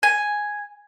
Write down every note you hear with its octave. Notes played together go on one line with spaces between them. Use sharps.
G#5